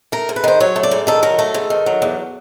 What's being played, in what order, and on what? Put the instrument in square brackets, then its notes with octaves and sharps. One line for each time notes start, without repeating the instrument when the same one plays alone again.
[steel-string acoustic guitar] A3 A#4
G#2
B4
D#3 C5
F#3 C#5
A3
D5
G#2
D#3 A4
F#3 A#4
A3 A4
G#2
D#3
F#3
E2